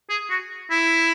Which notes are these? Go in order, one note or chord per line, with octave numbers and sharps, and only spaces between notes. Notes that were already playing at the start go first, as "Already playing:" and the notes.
G#4
F#4
E4